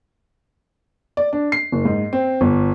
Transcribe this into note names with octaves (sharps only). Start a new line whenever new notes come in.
D5
D4
C7
F#1
G#2
C4
G1